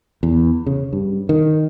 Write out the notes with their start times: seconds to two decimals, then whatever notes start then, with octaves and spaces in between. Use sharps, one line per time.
0.23 E2
0.67 C#3
0.93 G2
1.29 D#3